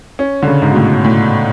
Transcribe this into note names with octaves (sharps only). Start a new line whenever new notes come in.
C#4
D3
C#3
G#2
B2
A2
A2